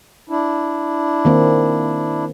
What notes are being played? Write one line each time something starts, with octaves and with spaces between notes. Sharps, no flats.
D4 E4
D#3 A#3 C4